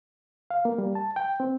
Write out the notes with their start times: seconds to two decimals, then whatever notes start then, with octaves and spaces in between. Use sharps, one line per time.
0.51 F5
0.65 A#3
0.78 G3
0.95 A5
1.16 G5
1.40 C4